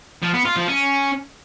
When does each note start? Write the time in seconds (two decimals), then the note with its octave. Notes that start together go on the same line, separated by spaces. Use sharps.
0.22 F3
0.34 B3
0.45 F4
0.56 F3
0.68 C#4